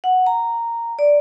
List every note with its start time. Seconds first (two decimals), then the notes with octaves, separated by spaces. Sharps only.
0.04 F#5
0.26 A#5
0.99 D5